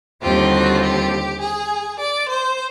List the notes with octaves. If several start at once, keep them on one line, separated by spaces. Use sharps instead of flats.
D#2 D3 G3 C4 F4 G4
F#4
G4
G#4
D5
C5